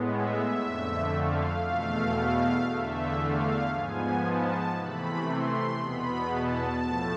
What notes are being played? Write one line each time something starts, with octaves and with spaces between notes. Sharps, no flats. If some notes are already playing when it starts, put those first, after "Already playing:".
Already playing: A2 G#3 B3
E5
F2 D3 A3
F5
E2 B2 A3 F5
F5
E2 D3 A3 E5
F5
G#2 F3 B3 G#5
A5
C3 E3 A3 B5
C6
E2 B2 B3 B5
A5
A2 F3 A3